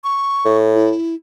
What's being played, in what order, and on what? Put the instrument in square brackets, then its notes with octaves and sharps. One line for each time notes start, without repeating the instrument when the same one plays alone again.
[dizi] C#6
[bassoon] A2
[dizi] E4